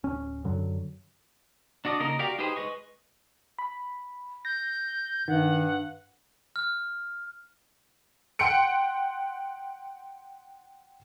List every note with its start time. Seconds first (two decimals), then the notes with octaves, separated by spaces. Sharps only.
0.04 D1 C#4
0.44 F#2 D3 F#3
1.85 D4 F#4 D5 D#5
2.00 C#3 A#3 D#4 A#4 D#5
2.19 F#4 G4 A#4 D5 F5
2.38 D#4 G4 G#4 B4 C5
2.56 G#3 B4 D#5 C#6
3.59 B5
4.45 G6 A#6
5.28 G2 D#3 F#5
6.56 F6
8.39 F#5 G5 C6 F#6 C#7 D7